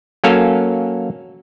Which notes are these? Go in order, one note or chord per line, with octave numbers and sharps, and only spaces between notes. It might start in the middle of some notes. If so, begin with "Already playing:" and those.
F#3 A#3 C#4 A4 F5 G#5